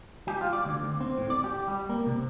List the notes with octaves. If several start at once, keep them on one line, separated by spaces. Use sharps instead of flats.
G4
F4
D5
D2
D2
C4
A2
D5
G4
G3
A#3
C3